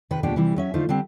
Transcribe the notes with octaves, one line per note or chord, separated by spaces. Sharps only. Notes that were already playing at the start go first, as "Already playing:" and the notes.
C3 D#3 B4
D#2 B2 F3 G#3 D4 G4
C3 E3 G3
F#3 C#4 E5
D3 F3 A3 D#4 F4 C5
D3 G3 C4